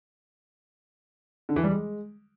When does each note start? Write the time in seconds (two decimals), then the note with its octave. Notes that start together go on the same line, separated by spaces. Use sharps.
1.49 D3
1.56 E3
1.64 G3
1.71 G#3